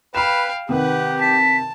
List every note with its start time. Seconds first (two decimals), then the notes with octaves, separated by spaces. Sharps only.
0.15 B4 F5 G5 B5 E7
0.69 C3 D#3 G4 B4 F#5
1.21 A5 B6